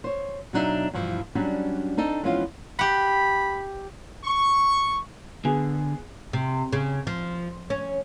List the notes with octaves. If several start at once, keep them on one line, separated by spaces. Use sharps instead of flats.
C5 C#5
B2 F#3 D4 D#4 E5
G2 B2 E3 F3
F#3 G3 C#4 D4
C4 D4 D#4 A4
E3 F3 G#3 B3 C#4 F4
G4 F#5 B5
C#6
D3 B3 G#4
C3
C#3
F3
C#4